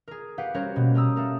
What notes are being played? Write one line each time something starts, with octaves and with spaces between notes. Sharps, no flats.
G#4 A#4
G4 B4 F5 F#5
G3 C#4 F#4 A#4 C5 C#5
B2 A#3
G4 A#4 A#5 D#6 E6
A3 A#3 A4 A#4